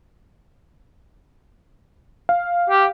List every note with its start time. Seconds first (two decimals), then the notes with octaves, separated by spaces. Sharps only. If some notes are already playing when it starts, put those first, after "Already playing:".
2.29 F5
2.70 G4